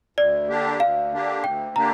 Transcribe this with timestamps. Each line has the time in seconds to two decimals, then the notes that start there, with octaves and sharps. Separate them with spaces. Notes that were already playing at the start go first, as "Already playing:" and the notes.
0.17 D2 D5
0.49 D3 A#3 D4 G4
0.80 D2 F5
1.12 D3 A#3 D4 G4
1.44 D2 G5
1.76 D3 A#3 D4 G4 A#5